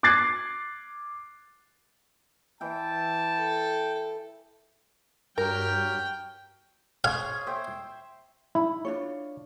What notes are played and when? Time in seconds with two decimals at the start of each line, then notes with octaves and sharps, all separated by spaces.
0.03 D6 F#6 G#6 A6 C7
2.61 E3 E4 G5 A5
3.38 A4
5.38 G2 F#3 G4 A#4 G5 F6
7.04 G#4 C5 C#5 F5
7.47 C5 E5 G5
8.55 D#4 E4 B5
8.85 D4 F4 C#5